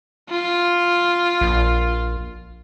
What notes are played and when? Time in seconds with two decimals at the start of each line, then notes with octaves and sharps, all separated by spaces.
0.30 F4
1.41 A#1